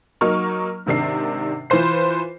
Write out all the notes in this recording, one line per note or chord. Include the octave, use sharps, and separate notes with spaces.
F#3 A#3 D#4 C#6 F6
G#2 C3 D#3 D4 C7
E3 F4 B4 C5 C7